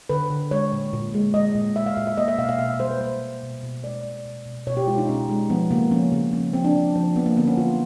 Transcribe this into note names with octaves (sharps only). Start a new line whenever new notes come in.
D3 B4
D3
G#3 C#5
A#2
A#2
G#3
G#3 D#5
A#2
A#2 E5
F5
A#2 E5
E5
A#3 D#5
E5
B2 F5
F5
B2 E5
G3 C5
B4
A#3 C5
G3
B2
B2
G#3 D5
B2
B2
B2
B2 C#5
G4
G#3 F4
D#4
B2 C#4
G#3
F3 B3
C#3 A#3
F3 C#4
C#3
F3 C#4
F3 C4
D4
F3
F3
A#3 B3
A#3
D3 B3
C#4
F#3 F4